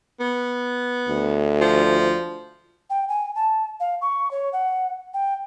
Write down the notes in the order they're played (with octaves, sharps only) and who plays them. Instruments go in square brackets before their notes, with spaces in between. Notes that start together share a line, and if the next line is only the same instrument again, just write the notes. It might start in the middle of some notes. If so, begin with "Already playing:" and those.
[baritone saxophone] B3
[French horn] D2
[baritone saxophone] F3
[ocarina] G5
G#5
A5
F5
C#6
C#5
F#5
G5